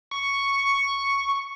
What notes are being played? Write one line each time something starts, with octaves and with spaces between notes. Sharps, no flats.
C#6